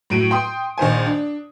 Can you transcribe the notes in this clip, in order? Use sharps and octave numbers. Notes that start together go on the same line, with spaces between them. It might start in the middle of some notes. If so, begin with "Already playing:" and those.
A2 F#3 D7 D#7
G5 C6 D#6
A#1 D#3 C5 G#5
D4